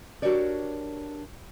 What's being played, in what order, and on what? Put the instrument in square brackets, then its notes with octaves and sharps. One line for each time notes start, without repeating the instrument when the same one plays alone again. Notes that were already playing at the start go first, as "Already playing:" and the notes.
[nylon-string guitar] D4 F#4 G4 A#4 C#5 D5